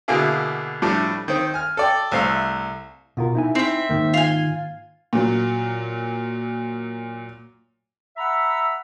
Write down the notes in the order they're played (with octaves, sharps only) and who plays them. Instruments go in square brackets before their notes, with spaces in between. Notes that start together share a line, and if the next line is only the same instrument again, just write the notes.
[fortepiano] B2 D3 A#3 E4 G#4
A2 F3 G3 A3 D4
D#3 C4
G#5 F6
A4 D5 G5
C2 A3 C5 F5
[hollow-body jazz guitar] B2 F4 A#4
D#4 E4 G#5
[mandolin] C4 E5
[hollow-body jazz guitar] G#2 D#3 A#3
[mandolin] F4 G#5
[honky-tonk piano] A#2 F#3
[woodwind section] E5 F#5 A#5 B5 E6